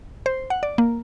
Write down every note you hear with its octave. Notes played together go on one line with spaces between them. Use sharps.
C5
F#5
D5
A#3